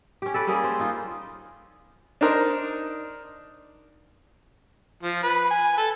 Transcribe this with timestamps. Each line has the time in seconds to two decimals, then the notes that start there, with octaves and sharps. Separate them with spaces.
0.22 C#4 G4
0.34 A4 B4 D5
0.47 G3 A#3 C#4 G#4
0.64 C5
0.80 D#4 F4
2.21 D4 D#4 A#4 C5
5.03 F3
5.23 B4
5.51 G#5
5.77 A4